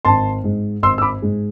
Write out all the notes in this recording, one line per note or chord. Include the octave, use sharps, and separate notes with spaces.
G#1 A5 C6
G#2 G#3
G#1 C6 E6
E6
B5 D6
G#2 G#3